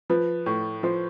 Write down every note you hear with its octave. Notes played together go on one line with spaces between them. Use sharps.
F3 B4
A2
F3 C5